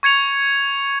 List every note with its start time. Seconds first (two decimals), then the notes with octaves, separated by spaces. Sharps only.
0.03 C#6 G#6 C#7 F7